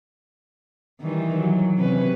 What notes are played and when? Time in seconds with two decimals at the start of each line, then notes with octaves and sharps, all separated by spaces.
1.01 D#3 E3 G3
1.37 F#3
1.78 C3 C#4 B4